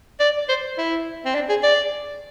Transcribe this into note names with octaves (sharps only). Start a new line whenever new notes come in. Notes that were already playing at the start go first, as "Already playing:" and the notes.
D5
C5
E4
C4
D4
G#4
D5